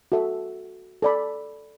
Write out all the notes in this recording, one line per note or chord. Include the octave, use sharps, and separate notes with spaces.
F#4 A4 E5
A4 D5 B5